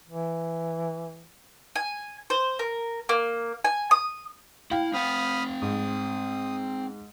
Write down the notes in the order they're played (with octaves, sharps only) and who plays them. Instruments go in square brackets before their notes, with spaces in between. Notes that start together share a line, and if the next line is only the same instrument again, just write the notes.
[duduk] E3
[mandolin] G#5
C5
A#4
A#3
G#5
D#6
[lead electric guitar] E4 [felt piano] F5 G5
[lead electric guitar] C4 F#5 [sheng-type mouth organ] B5 D#6 F6
[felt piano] G#2 [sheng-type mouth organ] D#6